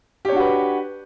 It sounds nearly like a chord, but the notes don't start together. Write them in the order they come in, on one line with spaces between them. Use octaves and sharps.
G4 C#5 D4 F#4 B4